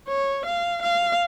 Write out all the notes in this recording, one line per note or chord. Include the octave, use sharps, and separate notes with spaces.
C#5
F5
F5